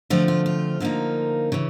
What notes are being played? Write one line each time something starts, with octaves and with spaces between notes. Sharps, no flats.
D3 F3 A3 C4 F4
F4
F4
D3 F3 A#3 D#4
C#3 E3